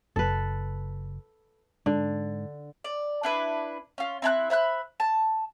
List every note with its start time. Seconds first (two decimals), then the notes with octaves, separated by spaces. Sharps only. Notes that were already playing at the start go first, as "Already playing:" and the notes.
0.16 F#1 A4 B4
1.86 G#2 D3
2.84 D5
3.23 D4 E4 B4
3.98 C#4 F4
4.22 C4 E4 A5 F#6
4.50 C5 E5 B5 F#6
5.00 A5